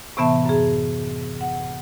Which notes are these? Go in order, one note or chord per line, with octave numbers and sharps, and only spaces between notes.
A2 C3 E3 B3 E5 A5
F#2 G#4
F#5